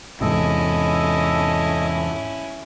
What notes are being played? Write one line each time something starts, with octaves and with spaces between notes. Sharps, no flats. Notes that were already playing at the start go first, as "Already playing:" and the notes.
E2 G#2 C3 C#4 E4 A4 D#5